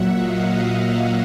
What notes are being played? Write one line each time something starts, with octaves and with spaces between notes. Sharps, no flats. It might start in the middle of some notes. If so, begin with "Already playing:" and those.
Already playing: A#2 F#3 E5 F#5
D#5 F5